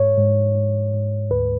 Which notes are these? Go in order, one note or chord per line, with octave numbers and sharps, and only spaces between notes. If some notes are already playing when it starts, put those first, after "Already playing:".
Already playing: G#2 C#5
G#2
G#2
G#2
D2 B4